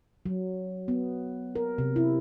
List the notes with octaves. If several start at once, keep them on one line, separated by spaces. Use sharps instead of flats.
F#3
B3
A#4
C3
E4